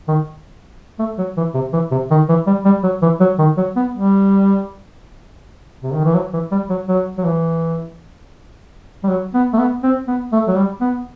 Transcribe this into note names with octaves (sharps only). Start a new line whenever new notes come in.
D#3
A3
F#3
E3
C3
E3
C3
D#3
E3
G3
G3
F#3
E3
F#3
D#3
F#3
B3
G3
C3
D#3
E3
F#3
E3
G3
F#3
F#3
F#3
E3
G3
F#3
B3
A3
B3
C4
B3
A3
F#3
G3
B3